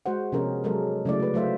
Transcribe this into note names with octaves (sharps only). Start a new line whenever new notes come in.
G#3 F#4 C5 F#5
C3 F3 B3 C#4 G#4 A#4
F#3 G#3 A4 A#4
C#3 F#3 A3 E4 D5
A3 B4
F#3 A3 F4 C5 E5